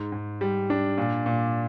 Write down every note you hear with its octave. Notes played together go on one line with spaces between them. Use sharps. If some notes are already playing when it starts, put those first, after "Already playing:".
Already playing: G#2
G#2
G3
D4
A#2
A#2